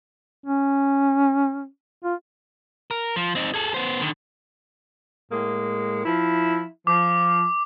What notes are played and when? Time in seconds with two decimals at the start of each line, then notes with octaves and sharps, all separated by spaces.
0.46 C#4
2.04 F4
2.91 A#4
3.16 F3
3.35 C4 D#4
3.54 G#4 A4
3.74 B3 C5
4.00 D3 D#3
5.32 A2 G#3 A#3
6.05 F3 E4
6.87 F3 D6